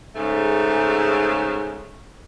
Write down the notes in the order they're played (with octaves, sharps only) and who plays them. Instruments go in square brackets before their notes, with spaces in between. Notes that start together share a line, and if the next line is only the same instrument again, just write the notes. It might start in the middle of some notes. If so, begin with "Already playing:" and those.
[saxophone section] G#2 C#3 A3